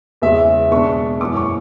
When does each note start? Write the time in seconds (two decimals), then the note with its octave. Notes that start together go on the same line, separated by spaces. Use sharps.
0.22 E2 C#3 G#3 E5
0.71 B2 G#3 D4 C#6
1.20 F#2 E3 B3 D6
1.37 C#6